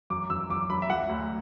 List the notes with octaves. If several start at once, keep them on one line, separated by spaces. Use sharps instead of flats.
F#2 D6
F#2 E6
F#2 D6
F#2 B5
E5
F#3 F#5
D2